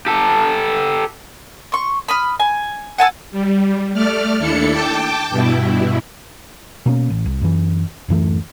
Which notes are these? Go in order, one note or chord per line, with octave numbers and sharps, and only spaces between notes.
G4 A4
C6 C#6
B5 D#6 F6
G#5
F#5 G#5 A5 E6
G3
A3 D5 F6
D#2 D4 E4 A4 C#7
G5 A5 D6
G2 B2 E4
B2 A#3 C4 C#4
A1
C2
F#2 E3
D1 F#2 E3 A3